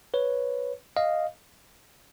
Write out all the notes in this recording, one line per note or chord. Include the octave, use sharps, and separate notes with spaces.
B4 C#5
D#5 F5